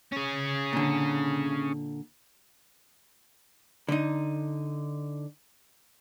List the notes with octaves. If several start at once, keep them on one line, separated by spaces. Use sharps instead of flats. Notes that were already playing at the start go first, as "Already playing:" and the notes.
C#4 G#4
A#2 D3
D3 D#4